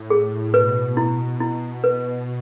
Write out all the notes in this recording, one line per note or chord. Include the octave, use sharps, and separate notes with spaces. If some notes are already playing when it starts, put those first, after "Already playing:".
Already playing: A2
G#4
B2 B4
E4
E4
B4